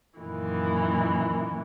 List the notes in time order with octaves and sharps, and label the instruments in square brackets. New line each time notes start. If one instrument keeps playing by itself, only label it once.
[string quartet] F#2 A#2 D#3 E3